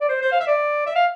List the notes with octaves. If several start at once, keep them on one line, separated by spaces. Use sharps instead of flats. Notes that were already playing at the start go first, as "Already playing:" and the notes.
D5
C5
C5
F5
E5
D5
E5
F5